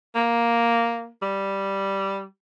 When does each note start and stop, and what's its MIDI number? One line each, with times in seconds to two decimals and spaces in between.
0.15 1.10 58
1.22 2.25 55